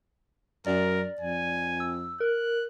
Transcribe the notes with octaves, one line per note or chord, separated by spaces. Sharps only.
F#2 A#4 D5
F2 G#5
E6
A#4 F#6